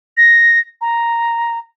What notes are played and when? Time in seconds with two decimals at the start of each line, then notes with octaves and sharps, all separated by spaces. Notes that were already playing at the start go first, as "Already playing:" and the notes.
0.17 A#6
0.81 A#5